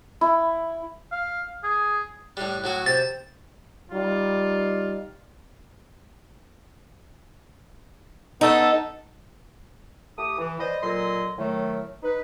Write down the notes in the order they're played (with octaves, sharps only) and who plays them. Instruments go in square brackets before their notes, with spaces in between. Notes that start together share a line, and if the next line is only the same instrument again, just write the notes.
[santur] E4
[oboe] F5
G#4
[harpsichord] A2 G3 [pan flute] F#6
[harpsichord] A2 F#3 F#4
[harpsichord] C3 [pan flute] C5 [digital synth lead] A6
[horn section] G3 D#4 F4
[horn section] B3 A4 [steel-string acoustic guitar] D#4
[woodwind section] A3 G4 D#6
E3
B4 C5 D5 D#5
A#2 F#3 A4 D#5 C6
A2 D#3 F#3 A3
D#4 B4